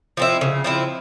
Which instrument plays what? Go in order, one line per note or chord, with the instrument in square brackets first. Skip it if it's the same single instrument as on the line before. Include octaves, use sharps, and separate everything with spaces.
[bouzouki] F3 C4 E4
C#3
F3 C4 E4